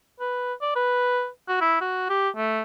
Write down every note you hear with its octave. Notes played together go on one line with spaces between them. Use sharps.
B4
D5
B4
F#4
E4
F#4
G4
A3